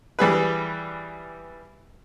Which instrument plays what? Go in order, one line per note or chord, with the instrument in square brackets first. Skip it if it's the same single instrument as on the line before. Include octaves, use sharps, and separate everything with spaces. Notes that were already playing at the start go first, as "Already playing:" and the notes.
[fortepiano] E3 G3 G#4 B4